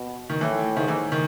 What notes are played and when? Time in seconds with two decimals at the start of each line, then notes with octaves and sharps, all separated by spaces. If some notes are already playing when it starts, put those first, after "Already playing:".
Already playing: B2
0.30 D#3
0.41 A2 E3
0.77 G#2 D#3
0.88 E3
1.12 D#3